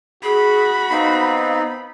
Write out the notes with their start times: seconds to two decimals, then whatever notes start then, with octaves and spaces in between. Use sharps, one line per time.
0.23 F#4 G#4 B5
0.91 B3 C4 D#4 F5